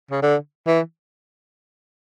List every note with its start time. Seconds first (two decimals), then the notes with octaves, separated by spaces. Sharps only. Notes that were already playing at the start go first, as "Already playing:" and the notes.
0.11 C#3
0.22 D3
0.67 E3